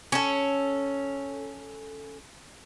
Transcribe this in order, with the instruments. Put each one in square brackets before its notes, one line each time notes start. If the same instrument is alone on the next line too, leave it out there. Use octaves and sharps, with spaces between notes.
[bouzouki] C#4 A4